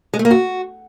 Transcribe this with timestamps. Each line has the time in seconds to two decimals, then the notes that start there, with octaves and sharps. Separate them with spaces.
0.14 G#3
0.19 A3
0.25 A#3
0.31 F#4